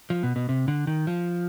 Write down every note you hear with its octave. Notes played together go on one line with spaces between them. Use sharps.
F3
B2
B2
C3
D3
D#3
F3